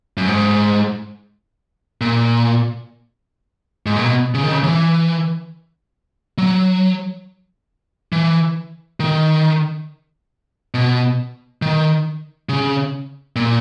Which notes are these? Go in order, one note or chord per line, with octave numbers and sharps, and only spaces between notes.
F#2
G#2
A#2
G#2
A#2
B2
C#3
D#3
C#3
E3
F#3
E3
D#3
B2
D#3
C#3
A#2